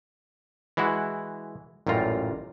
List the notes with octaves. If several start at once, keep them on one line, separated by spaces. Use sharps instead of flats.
E3 G#3 E4 F#4
A1 F#2 A#2 G3 F4 A#5